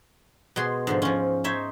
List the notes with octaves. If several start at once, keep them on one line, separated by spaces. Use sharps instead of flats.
B2 G#3 G#4 C6
G#2 D3 F3
F3 C#4
D#4 C5 C#5 E5